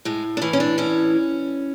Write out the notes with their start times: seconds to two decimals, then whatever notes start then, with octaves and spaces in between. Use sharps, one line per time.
0.05 A2 G#3
0.37 D4
0.42 E3 C#4
0.53 C#4
0.60 D4
0.78 A2 C#4